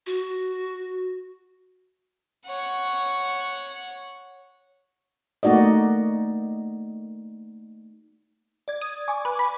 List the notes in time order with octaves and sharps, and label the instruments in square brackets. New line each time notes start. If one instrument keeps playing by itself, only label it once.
[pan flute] F#4
[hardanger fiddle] C#5 F#5
[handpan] A3 A#3 D#4 F#4 D5 D#5
[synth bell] D5 G#6
[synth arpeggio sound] D#6
[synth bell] G#5 C#6 D6
[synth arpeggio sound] B4
B5